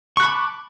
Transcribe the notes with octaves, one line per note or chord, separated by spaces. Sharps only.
A5 B5 C#6 D6 F#6